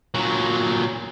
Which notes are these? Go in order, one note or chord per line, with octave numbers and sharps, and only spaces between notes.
A#2 F#3